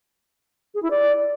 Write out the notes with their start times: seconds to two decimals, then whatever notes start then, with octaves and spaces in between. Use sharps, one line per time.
0.75 G#4
0.83 E4
0.91 D5